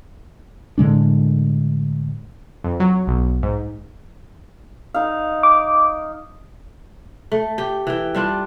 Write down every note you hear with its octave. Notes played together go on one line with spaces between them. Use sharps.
A2 D3 G#3 D4
F2
F#3
B1
G#2
D#4 F5
D6
A3
G4
E3 G5
G3 D4 F4